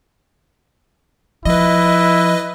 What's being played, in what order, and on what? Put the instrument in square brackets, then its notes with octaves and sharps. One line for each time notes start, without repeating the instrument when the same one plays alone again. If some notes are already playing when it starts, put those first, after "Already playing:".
[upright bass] F3 [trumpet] E4 [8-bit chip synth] B4 D#5